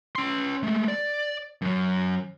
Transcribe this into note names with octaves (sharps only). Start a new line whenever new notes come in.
C#4 C6
G#3 A3
D5
F#2 F#3